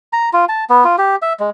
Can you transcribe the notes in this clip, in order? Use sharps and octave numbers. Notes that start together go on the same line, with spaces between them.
A#5
F4
A5
B3
F4
G4
E5
G#3